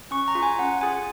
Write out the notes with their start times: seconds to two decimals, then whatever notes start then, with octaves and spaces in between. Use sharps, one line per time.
0.11 C#4 C#6
0.28 A#5
0.35 F4 G#4
0.43 G#5
0.59 C#4 F#5
0.81 F4 G#4 G#5